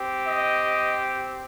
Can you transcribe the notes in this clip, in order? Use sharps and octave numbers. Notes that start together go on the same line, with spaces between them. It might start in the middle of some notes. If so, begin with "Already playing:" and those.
Already playing: C4 G4
D#5